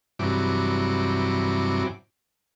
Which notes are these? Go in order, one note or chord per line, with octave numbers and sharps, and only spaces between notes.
G2 C3 E3 F#3 D6